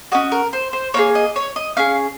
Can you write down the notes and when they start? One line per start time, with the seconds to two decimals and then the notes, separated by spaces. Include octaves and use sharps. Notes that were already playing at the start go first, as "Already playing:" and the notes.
0.12 C#4 F#4 D#5
0.32 A#4
0.53 C5
0.73 C5
0.94 A#3 D#4 G#4 C#5
1.15 D#5
1.36 C#5
1.56 D#5
1.77 C#4 G#4 F5